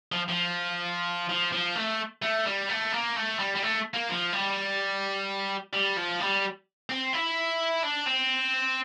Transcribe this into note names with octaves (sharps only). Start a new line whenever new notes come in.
F3
F3
F3
F3
A3
A3
G3
A3
A#3
A3
G3
G3
A3
A#3
F3
G3
G3
F3
G3
C4
E4
D4
C4